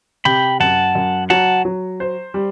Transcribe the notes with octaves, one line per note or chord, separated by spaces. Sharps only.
C3 G5 B5
F#2 F#5 A5
F#2
F#3 F#5 A5
F#3
C5
G3